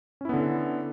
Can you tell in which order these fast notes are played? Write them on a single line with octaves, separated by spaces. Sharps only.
C#4 E4 B3 D3